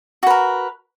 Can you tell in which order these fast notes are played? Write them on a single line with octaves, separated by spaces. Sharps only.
F#4 B4 A#4